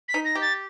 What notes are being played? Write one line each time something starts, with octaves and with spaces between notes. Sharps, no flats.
B6
D#4
A#6
G4
A6